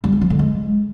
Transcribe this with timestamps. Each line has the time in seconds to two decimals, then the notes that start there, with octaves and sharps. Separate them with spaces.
0.04 G3
0.13 E4
0.21 F3
0.30 D3
0.39 G#3